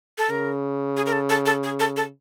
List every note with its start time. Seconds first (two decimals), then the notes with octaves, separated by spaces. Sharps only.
0.18 A4
0.30 C#3 A#4
0.97 G#4
1.06 A#4
1.13 A4
1.30 A4
1.46 A4
1.63 G#4
1.80 A4
1.97 A4